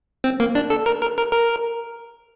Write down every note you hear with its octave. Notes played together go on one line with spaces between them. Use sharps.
C4
A#3
D4
A4
A#4
A#4
A#4
A#4